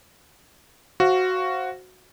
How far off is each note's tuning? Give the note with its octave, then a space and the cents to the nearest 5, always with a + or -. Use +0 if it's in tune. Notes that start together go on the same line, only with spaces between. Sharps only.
F#4 +0 C5 +10 F5 -20